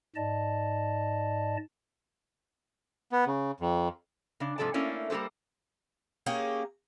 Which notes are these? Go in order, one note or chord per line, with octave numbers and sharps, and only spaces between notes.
G#2 D5 D#5 A5
B3
C#3
F2
C#3 D4
G#2 C3 F3 A4 D5 A5
A3 A#3 C#4 D4 E4
G3 A#3 G4 A4 C5
A#3 C#4 G4 G#4